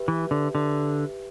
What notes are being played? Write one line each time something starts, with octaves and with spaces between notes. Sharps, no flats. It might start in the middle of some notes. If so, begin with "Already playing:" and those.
Already playing: G4 B4 E5
E3
D3
D3